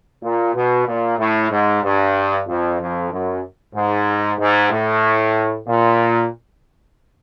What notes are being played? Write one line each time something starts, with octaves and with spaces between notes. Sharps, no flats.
A#2
B2
A#2
A2
G#2
G2
F2
F2
F#2
G#2
G#2
A2
A#2